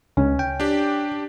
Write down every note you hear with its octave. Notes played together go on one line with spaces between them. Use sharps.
C#2 C#4
G5
D4 G4